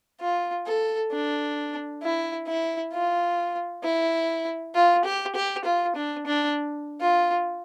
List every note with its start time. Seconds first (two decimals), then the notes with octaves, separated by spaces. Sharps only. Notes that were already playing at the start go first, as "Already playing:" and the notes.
0.21 F4
0.66 A4
1.12 D4
2.03 E4
2.47 E4
2.93 F4
3.84 E4
4.75 F4
5.05 G4
5.35 G4
5.65 F4
5.96 D4
6.26 D4
7.01 F4